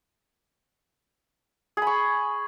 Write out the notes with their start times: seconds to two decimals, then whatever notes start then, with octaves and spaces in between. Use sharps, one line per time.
1.77 G#4
1.82 B5
1.87 C#6